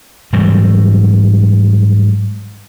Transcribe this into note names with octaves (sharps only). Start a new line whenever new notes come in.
G#2 E3 F#3 G3